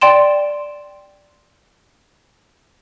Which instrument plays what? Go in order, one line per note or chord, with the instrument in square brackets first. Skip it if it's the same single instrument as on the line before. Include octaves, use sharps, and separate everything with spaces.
[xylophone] D5 G5 C6 E7